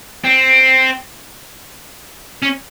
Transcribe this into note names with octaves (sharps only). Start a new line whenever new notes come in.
C4
C#4